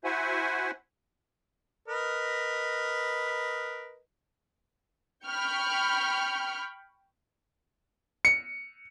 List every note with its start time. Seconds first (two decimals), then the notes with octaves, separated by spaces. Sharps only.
0.04 E4 F#4 C5 E5 F#5 G#5
1.88 A#4 B4 D#5
5.27 G5 B5 C#6 F6 G6
8.25 C#7